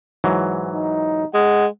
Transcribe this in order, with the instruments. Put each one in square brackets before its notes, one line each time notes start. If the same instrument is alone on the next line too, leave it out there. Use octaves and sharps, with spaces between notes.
[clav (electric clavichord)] G#2 E3 F#3
[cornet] D#4
[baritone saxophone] G#3 [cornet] F#5